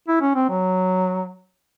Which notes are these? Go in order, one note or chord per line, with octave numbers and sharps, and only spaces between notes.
E4
C#4
C4
F#3